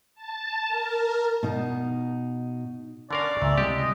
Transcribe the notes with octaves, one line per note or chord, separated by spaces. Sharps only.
A5
A#4
B2 D#4
D3 C#4 A#4 D5 F5
C#2 A#2 E5
C3 G3 G#3 G4
D#5